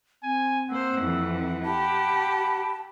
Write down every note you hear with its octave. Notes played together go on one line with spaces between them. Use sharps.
C4 G#5
A#3 C5 F#5 E6
F2 E3
G4 A5 B5